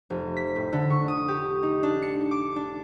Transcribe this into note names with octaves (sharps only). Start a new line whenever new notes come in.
F1
B6
A2
D3
C#6
D#6
G4
D#4
D4
C#7
D6
D4